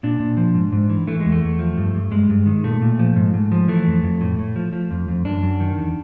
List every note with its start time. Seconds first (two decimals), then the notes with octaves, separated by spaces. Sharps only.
0.03 A#2 D4
0.20 A#2
0.37 F3
0.54 G#2
0.72 G#2
0.90 E3
1.07 E3 A3
1.21 E2 G#3
1.32 A3
1.43 E2
1.59 F3
1.77 G2
1.94 G2
2.11 G2 G#3
2.29 G2
2.46 D#3
2.64 A#2 A3
2.81 A#2
2.99 F3
3.16 G#2
3.34 G#2
3.52 F3
3.68 E3 A3
3.87 F2
4.03 F2
4.21 A2
4.39 A2
4.56 F3
4.73 F3
4.91 F2
5.08 F2
5.25 F#2 D4
5.43 F#2
5.60 D#3
5.78 E2